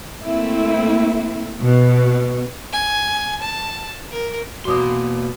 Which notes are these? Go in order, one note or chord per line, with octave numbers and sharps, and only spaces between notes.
A3 A#3 C4 E4
B2
G#5
A5
A#4
E2 B2 A#3 F#4 C6 D6 D#6